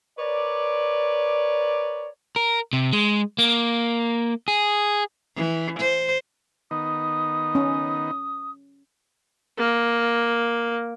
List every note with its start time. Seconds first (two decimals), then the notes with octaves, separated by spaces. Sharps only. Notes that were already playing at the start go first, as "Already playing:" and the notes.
0.19 A#4 B4 C#5 D5
2.36 A#4
2.73 C3
2.93 G#3
3.38 A#3
4.48 G#4
5.36 E3
5.80 C5
6.71 D#3 B3 D#4 D#6
7.55 C#4
9.58 A#3